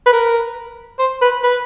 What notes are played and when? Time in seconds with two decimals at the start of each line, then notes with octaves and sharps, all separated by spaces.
0.06 B4
0.13 A#4
0.99 C5
1.22 B4
1.44 B4